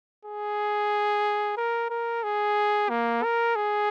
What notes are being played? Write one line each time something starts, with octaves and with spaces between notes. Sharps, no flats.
G#4
A#4
A#4
G#4
A#3
A#4
G#4